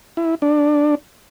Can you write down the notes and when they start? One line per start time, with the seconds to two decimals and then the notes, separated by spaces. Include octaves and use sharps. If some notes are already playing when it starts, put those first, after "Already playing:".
0.17 E4
0.42 D4